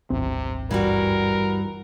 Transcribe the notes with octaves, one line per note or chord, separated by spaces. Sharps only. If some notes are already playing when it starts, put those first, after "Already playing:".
D1 G#1 C3 C4
G2 E3 G3 F#4 A#4